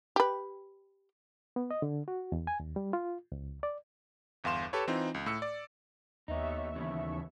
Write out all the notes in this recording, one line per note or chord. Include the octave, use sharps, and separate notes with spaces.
G4 B4
B3
D#5
D3
F#4
E2
G#5
D#2
G3
F4
C#2
D5
G1 E2 F5 C6 E7
G4 A4 B4 C#5
E3 C4 D#4 F4
C#2
A2 E6 C#7
D5
D#2 B3 D#4 E5 C#6
C#3 E3 B3